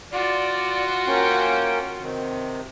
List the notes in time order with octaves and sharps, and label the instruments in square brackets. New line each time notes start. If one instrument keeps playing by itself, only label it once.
[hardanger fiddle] F4 F#4 [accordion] D5
[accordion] A#3 C#4 G5
C3 D#3